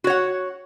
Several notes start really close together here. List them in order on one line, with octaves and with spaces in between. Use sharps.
F#4 C#5 F#5